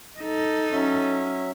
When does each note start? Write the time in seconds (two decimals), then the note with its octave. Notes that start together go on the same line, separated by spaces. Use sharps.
0.19 D#4 A4
0.73 F#3 C#4 E5